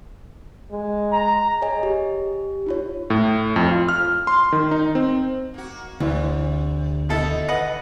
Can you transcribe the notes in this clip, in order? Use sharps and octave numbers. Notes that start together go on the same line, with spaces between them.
G#3
A#5
G#4 C#5 D#5 G#5
G4
D#4 F4 C#5
A2
F2
F4
F6
C6
D#3
D#4
C4
A#3 F#4
D2 C3 E3
B2 D#3 D#4 E4 A4
B4 D#5 F#5